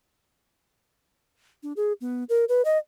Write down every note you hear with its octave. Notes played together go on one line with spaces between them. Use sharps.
D4
G#4
B3
A#4
B4
D#5